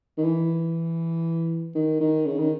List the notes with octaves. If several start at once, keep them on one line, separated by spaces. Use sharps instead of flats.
D#3
E3
D#3
D#3
C#3
D#3